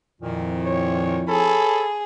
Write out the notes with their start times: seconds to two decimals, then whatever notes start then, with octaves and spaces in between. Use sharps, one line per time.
0.21 F2 A#2 D#3 F3 C4 E4
0.65 C#5
1.28 G#4 A4 C#5 A5 B5